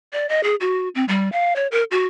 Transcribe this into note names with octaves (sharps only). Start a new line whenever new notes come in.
D5
D#5
G#4
F#4
C4
G3
F5
C#5
A#4
F#4